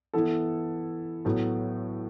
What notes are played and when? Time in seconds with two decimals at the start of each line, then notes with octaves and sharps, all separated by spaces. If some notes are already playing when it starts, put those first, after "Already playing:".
0.14 E3 B3 E4 A4
1.25 A2 F#3 B3 F#4 A4